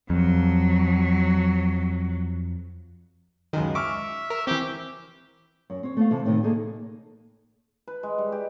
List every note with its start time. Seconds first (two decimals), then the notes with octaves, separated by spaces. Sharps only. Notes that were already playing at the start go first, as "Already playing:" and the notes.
0.10 F2 F#3
3.53 C#2 F#2 D#3 G#3
3.75 E5 C#6 D6 F6
4.30 A#4
4.47 E3 C4 G4
5.70 F#2
5.83 C4 C#5
5.97 A3 B3 F5
6.11 C3 E3 A5
6.25 A2 C3 D#3
6.43 A#3 D#4 G#4 A4
7.88 B4
8.03 G#3
8.18 G3
8.32 G4